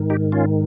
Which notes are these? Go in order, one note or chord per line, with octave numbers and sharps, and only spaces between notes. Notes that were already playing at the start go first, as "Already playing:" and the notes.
Already playing: G#2 D#3
D#4 G4
C#4 F4